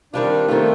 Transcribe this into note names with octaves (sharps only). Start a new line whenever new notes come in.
D#3 G3 C4 D4 F4
D#3 G3 A3 C4 F4